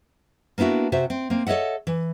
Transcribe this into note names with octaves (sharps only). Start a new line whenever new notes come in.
A#3 B3 D4 E4 F#4
C3 F#4 C5 E5
C4
A#3 C4
A4 C#5 D#5 E5 F#5
E3